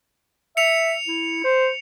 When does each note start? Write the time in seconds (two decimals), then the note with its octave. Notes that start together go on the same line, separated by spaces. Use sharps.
0.57 E5 C#7 F7
1.07 E4
1.45 C5